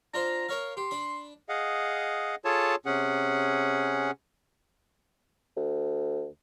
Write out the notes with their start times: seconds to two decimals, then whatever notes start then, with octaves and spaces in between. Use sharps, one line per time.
0.14 D4 F4 C5 A#5
0.49 A#4 C#5 F5
0.77 G4 C6
0.91 D4 B5
1.49 G#4 D#5 F5 F#5
2.45 F4 G#4 A4 C#5 A5
2.86 C3 C#4 G#4 F#5
5.57 D2